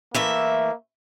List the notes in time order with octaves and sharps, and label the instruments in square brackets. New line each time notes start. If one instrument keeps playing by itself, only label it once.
[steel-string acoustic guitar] E3 A3 E5 [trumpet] A#3